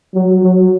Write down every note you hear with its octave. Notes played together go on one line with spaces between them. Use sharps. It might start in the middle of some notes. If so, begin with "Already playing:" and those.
F#3
F#3